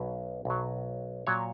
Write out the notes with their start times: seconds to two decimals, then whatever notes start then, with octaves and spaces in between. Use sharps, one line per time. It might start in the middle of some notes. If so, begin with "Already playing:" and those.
Already playing: B1 B2 F#3 B4
0.45 B1 B2 F#3
1.27 A#2 F#3 C#5